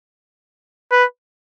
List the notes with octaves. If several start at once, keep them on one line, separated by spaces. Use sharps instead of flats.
B4